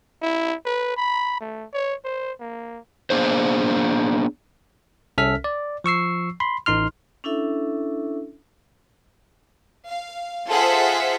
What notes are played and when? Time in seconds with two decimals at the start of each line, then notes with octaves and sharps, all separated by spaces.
0.22 E4
0.65 B4
0.97 B5
1.40 A3
1.73 C#5
2.05 C5
2.40 A#3
3.10 A#3 B3 D4 G#4 C5
5.18 C2 C#4 A4 E5 F6 B6
5.44 D5
5.84 F3 C#6 E6 C7
6.40 B5 C6
6.66 A1 D#4 C6 F6
7.24 C#4 D4 E4 A4 E5
9.87 F5
10.49 F4 G#4 A4 C5 E5 F#5